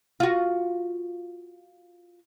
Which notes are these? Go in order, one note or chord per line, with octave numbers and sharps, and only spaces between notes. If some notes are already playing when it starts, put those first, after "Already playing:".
F4 F#4